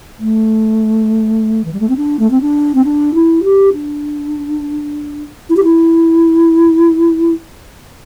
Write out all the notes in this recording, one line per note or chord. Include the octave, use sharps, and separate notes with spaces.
A3
E3
G3
A3
C4
D4
A3
C4
D4
C4
D4
E4
G4
D4
E4
G4
E4